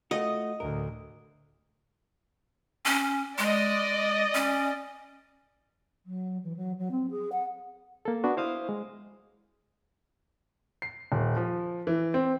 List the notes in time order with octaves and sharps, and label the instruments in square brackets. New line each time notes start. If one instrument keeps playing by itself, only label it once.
[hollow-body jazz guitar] A3 F4 F#4 [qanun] D#5
[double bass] D2 A2 [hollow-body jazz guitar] A#4
[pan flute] C#4
[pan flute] G#3 [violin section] D5 D#5
[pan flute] C#4
[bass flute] F#3
E3
F#3
F#3
C4
G#4
F#5
[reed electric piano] A#3 A4
B3 D4 F#4
E4 C5 F5 D#6
G#3
[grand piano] C7
D#1
F3
E3
C4